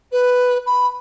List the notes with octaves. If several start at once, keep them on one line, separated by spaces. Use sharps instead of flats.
B4
B5